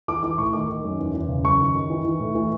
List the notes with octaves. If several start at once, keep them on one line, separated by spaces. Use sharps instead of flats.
E3 D6
E3 D6
A2 C#6
D#3 D6
D#3
F#2
E2
E2
C#3
F#2 C#6
D#3
D#3
E3
E3
A2
E3